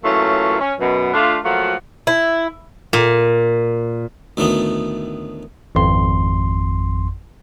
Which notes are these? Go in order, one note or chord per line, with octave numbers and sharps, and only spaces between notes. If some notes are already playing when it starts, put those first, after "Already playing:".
E3 F#3 A3 A#3 C#4 F4
C#4
F#2 B2
A3 D4 F4
F3 F#3 A3 A#3 F4 F#4
E4
A#2
D2 A2 D#3 A3 B3
G#1 F2 C6